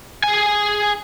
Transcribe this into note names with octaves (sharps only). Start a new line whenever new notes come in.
G#4 G#5